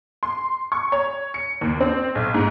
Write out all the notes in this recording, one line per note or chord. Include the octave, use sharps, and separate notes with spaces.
C6
C#6
C#5
C#7
D#2
C4
B1
G#2